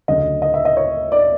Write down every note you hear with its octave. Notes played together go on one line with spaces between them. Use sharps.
D2 C#3 F#3 A3 D#5
D#5
E5
D#5
C#5
D5